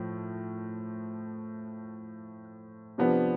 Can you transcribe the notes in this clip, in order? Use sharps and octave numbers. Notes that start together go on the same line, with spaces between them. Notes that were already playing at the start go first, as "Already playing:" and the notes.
Already playing: A2 F3
C3 F3 B3 D4